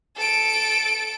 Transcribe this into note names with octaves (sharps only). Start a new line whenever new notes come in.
A4 D7